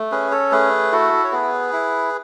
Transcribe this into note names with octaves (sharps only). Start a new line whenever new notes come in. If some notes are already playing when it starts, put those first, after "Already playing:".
Already playing: A3
C#4 G#4 B4
A4 C#5
A3 G#4 B4
E4 F#4 A4
C#5
B3 G#4 B4
E4